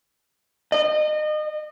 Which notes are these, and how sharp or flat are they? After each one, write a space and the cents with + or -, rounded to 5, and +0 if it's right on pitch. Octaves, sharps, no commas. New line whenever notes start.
D#5 -30